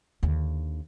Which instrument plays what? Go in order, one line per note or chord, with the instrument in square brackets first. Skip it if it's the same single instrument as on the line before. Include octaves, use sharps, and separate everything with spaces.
[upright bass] D#2 D3